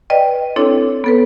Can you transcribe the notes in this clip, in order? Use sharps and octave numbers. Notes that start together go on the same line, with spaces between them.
B4 D5 D#5 G5
C4 D4 E4 A4 C#5
B3 A4 B4